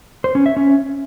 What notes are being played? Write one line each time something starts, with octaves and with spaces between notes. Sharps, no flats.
C5
C#4
E5
C#4